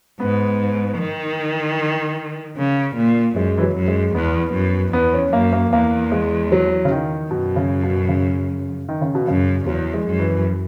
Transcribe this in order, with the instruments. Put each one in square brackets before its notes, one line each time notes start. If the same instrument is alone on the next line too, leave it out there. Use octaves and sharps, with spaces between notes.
[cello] G#2 [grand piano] B3
[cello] D#3
C#3
A#2
[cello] F#2 [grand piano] G#3
[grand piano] E3
F#3
[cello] F#2
[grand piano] G#3
[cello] E2 [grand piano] B3
[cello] F#2
[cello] E2 [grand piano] B3
[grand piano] C#4
[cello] F#2 [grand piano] A#3
[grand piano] A#3
[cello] E2 [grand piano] A#3
[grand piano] G#3
F#3
C#3
D#3
[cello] F#2 [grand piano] B2
[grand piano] C#3
B2
C#3
D#3
C#3
B2
[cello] F#2 [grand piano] C#3
[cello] E2 [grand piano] F#3
[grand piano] G#3
[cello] F#2
[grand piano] E3